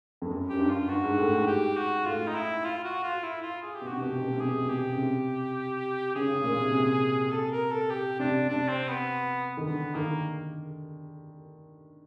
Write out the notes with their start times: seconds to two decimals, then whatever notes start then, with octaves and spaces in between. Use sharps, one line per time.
0.22 F2
0.31 F#2
0.50 F#2 G4
0.60 G2
0.70 F4
0.89 G2 F#4
1.04 G#2
1.18 A2
1.33 G#2
1.47 G4
1.77 F#4
2.06 A2 F4
2.28 D#4
2.35 E4
2.64 F4
2.84 F#4
3.03 F4
3.23 E4
3.42 F4
3.62 G#4
3.75 G4
3.81 B2
3.88 C3 F#4
4.01 B2 G4
4.12 C3
4.22 B2
4.32 C3
4.40 B2 G#4
4.53 C3
4.63 B2
4.69 G4
4.91 C#3
4.98 C3
6.15 C#3 G#4
6.30 C#3
6.44 A#2
6.60 C3
6.74 C3
7.32 A4
7.52 A#4
7.71 A4
7.90 G4
8.19 C3 D4
8.49 C3 D4
8.69 C4
8.88 B3
9.57 D#3
9.66 D3 B3
9.95 D#3 A#3